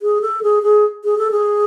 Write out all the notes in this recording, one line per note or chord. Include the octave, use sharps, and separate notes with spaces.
G#4
A4
G#4
G#4
G#4
A4
G#4